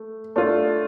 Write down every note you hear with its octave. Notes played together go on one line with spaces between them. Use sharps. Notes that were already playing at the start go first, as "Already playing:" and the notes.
Already playing: A3
A3 D4 F4